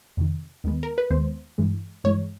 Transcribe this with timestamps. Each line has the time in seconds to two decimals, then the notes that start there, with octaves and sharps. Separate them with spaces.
0.17 F2 C3 D#3
0.64 D#2 D#3 G#3 B3
0.83 A#4
0.98 B4
1.10 D#2 D#3 G#3 B3 C5
1.58 G2 E3 G#3
2.04 G2 E3 G#3 C#5